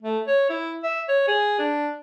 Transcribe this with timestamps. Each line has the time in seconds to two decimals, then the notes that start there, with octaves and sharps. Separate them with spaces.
0.02 A3
0.28 C#5
0.49 E4
0.83 E5
1.09 C#5
1.28 G#4
1.59 D4